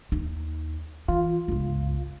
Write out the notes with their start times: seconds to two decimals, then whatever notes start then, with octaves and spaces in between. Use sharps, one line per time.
0.12 D#2 D#4
1.08 E3 F4
1.48 G1 C#2